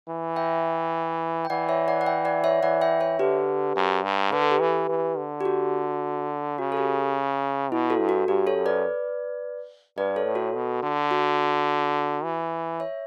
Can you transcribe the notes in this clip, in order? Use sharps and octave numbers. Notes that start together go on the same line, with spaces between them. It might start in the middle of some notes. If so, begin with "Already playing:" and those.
E3
E5 G5
G5
E3 D5 F#5
C#5 E5
D5 F#5
F#5
E5 G5
D5 F#5
C#5 E5
E3 D5 F#5
E5 G5
C#5 E5
D3 G4 B4
F#2
G2
D3 B4
A4
G4 B4
E3
E3
D3
G4
F#4
C#3 F#4
A4
G4
B2 E4
F#4 A4
G2
F#4
G2 G4
A4 C#5
F#2
B4 D5
G2 B4 D5
A4 C#5
A2
F#4 A4
B2
D3
F#4
E3
C#5 E5